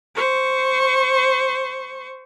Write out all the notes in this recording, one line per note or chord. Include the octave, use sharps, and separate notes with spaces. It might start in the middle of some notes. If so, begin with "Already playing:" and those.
C5 C#6